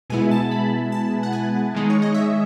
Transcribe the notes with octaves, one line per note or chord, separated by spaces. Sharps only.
B2 G#3 B3 E4 G#5
A5
B5
A5
F#5
G#5
D#3 G#3 D#4
C#5
D#5
E5